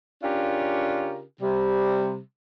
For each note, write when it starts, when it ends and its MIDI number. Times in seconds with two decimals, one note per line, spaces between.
0.22 1.21 49
0.22 1.21 61
0.22 1.21 62
0.22 1.21 65
0.22 1.21 67
0.22 1.21 70
1.41 2.20 48
1.41 2.20 55